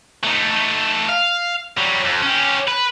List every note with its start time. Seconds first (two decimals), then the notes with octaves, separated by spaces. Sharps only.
0.24 A3 D#4
1.09 F5
1.78 F#3 G3
2.05 F2
2.23 C#4 G4
2.68 B4